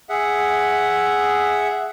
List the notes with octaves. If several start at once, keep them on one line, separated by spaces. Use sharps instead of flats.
G#4 E5 F#5